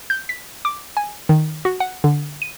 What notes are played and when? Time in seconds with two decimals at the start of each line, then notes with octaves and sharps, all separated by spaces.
0.10 G6
0.29 B6
0.65 D6
0.97 G#5
1.29 D#3
1.65 F#4
1.80 F#5
2.04 D3
2.42 D#7